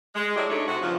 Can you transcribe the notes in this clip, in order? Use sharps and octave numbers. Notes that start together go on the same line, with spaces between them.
G#3
F#3 G3 A3 E4 G4
D2 A3 D4 D#4 C#5
C3 F#4
G2 C#3 F3